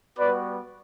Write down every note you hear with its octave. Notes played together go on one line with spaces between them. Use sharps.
G3 B3 F#4 B4 D5